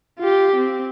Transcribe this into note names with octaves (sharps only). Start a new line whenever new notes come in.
F4 G4
C4